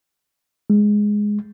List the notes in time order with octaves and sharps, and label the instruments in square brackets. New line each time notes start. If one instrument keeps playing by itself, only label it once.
[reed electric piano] G#3